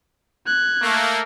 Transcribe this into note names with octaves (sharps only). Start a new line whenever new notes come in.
F#6 G#6
A3 A#3